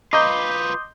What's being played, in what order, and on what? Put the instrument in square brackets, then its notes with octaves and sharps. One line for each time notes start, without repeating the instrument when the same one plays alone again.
[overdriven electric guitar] F4 B4 [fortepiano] D#5 A#5 [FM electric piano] C6 D#6 G6 [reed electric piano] D6